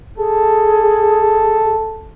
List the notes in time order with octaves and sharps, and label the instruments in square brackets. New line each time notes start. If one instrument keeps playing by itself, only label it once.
[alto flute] G#4 [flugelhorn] A4